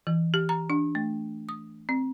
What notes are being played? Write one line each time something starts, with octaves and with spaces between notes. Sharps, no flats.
E3
G4
A#5
D4
A3
D#6
C4